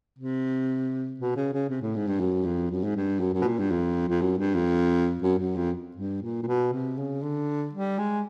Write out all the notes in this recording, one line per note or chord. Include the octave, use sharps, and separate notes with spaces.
C3
B2
C#3
C#3
C3
A2
G#2
G2
F#2
F2
F#2
G#2
G2
F#2
F#2
B2
A#2
G2
F2
F2
F#2
G2
F2
F#2
F#2
F2
G2
A#2
A#2
B2
C3
C#3
D3
G3
G#3